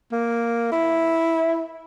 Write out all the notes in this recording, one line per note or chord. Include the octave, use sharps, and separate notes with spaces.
A#3
E4